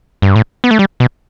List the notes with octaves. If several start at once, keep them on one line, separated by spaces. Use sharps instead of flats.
G2
A2
B3
A3
G3
B2